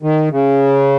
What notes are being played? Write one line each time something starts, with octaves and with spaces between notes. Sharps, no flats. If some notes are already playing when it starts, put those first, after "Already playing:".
D#3
C#3